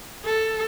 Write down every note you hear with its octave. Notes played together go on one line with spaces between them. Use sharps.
A4